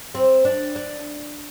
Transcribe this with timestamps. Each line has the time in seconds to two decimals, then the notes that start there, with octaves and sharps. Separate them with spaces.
0.15 C4
0.45 D4
0.76 D4